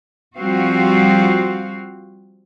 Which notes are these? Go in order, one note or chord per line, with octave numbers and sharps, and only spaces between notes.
F3 G3 C4 F#4 F5